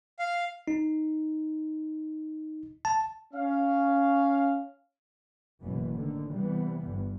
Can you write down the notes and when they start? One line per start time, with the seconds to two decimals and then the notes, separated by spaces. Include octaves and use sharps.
0.19 F5
0.68 D#4
2.85 A5
3.34 C#4 F5
5.62 F#1 F#2 B2 E3 B3
5.95 A2 D3 D#3
6.30 C3 E3 G3 B3
6.85 G1 G2